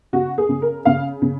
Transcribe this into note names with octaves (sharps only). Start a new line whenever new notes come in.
C#3 F#4
G#4
C#3
A#4
C#3 F5
C#3